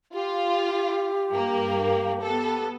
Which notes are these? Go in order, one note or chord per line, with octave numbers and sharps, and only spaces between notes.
F4 G4
G2 A#3
B3 A4